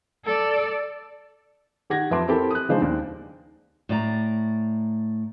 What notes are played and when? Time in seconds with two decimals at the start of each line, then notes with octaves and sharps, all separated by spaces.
0.25 A4 D5
1.90 D#3 G4 F#5 G#6 A#6
2.11 F2 B4 E5 A5 C6 D6
2.28 C4 E4 G4 A4 A#4 A5
2.51 D#6 F#6
2.69 C#3 F3 G#3 D4 D#4 C5
2.82 D#2
3.89 A2 D5 A#5